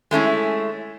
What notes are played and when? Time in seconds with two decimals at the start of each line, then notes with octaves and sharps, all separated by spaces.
0.11 G#3 A3 C#4 E4